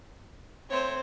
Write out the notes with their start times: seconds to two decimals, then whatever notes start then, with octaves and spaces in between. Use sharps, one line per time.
0.70 A3 C4 C5 C#5